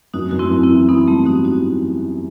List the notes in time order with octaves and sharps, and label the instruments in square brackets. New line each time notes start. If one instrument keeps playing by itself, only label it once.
[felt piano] F#2 [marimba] D#4 F#4
[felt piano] F#2 [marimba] F#4
[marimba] C4 E4
[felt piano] F#2
[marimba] C4 E4
[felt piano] E3
[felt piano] E3 [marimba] B3 D#4
[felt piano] G3 [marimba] A3 C4
[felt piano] G3 [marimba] D#4 F#4
[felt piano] E3 [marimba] D#4 F#4